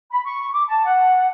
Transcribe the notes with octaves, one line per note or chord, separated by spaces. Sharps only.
B5
C#6
D6
A5
F#5